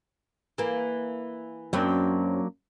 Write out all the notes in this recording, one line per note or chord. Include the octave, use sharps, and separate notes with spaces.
E3 A#3
F#2 F#3 A#3 C4 D4